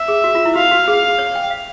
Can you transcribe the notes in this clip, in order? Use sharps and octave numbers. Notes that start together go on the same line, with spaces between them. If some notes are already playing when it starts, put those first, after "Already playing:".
Already playing: E5
G#4
F#4
F4
E4
F#4 F5
F#4
G#4 F5
C#5
G5
F5